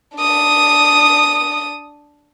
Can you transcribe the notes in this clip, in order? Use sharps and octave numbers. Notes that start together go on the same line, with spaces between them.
D4 D#6